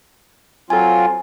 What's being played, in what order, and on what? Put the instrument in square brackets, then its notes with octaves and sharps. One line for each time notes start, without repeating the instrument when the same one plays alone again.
[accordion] F#3 C4 F4 [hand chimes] A4 G#5